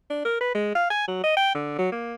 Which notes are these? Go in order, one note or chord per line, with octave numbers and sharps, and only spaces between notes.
D4
A#4
B4
G#3
F5
G#5
F#3
D#5
G5
D3
F#3
A#3